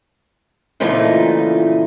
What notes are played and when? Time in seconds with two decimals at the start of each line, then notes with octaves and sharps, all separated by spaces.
0.80 A#2 C#3 E3 F3 A3 D#4